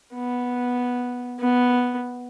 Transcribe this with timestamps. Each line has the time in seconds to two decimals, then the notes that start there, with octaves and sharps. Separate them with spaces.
0.14 B3
1.40 B3